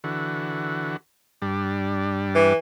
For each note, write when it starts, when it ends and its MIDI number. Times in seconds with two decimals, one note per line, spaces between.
0.04 0.97 50
0.04 0.97 52
0.04 0.97 66
1.42 2.53 43
1.42 2.53 55
1.42 2.53 62
2.35 2.56 52